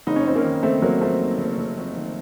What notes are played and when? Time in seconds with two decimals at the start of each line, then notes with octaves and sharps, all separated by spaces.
0.07 F#1 D#4
0.16 C#4
0.26 F2 C4
0.35 A#3 C#4
0.44 D#3
0.63 F#1 A3 C4
0.82 F#1 F#3 A#3
1.01 F2 A3 C4
1.20 D#3
1.38 F#1
1.58 F#1
1.77 F2
1.95 D#3